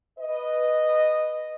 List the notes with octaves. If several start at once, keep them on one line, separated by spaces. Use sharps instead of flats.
B4 D#5